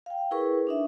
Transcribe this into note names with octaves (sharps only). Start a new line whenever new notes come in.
F5 G5
E4 G#4 A#4 B4 C#6
D4 D#4 E5